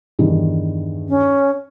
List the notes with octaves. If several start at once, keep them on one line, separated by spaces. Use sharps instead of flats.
E2 G2 D#3
C#4